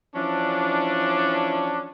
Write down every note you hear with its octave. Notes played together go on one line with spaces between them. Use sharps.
E3 F3 C#4 D4